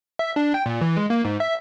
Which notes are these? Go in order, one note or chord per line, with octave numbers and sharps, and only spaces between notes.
E5
D4
G5
A#2
E3
G#3
A#3
G#2
E5